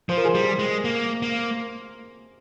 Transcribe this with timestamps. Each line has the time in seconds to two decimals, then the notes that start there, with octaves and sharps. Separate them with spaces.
0.09 F3 C5
0.17 A#4
0.25 G#4 C5
0.35 G3
0.59 G#3
0.85 A#3
1.22 A#3